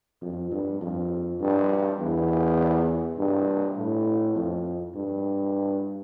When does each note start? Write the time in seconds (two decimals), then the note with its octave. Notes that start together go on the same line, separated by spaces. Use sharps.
0.22 F2
0.51 G2
0.81 F2
1.40 G2
1.99 E2
3.18 G2
3.77 A2
4.35 F2
4.95 G2